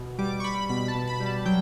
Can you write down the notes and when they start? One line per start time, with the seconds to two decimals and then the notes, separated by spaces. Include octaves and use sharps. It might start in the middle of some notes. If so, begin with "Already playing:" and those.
Already playing: B2
0.18 G3 D6
0.40 C#6
0.44 G3 B5
0.69 B2 B5
0.88 A5
0.95 B2
1.07 B5
1.20 G3
1.26 A5
1.45 F#3 G5